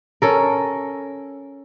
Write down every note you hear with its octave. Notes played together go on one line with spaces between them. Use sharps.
C#4 A4 A#4